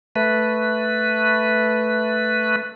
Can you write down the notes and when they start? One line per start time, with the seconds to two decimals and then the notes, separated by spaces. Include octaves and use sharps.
0.16 A3 B4